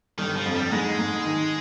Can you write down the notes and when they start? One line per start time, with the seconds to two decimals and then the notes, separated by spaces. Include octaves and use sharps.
0.18 G1 D#3
0.36 F3
0.45 F2
0.54 G3
0.71 G#2 G#3
0.99 G#2
1.25 D#3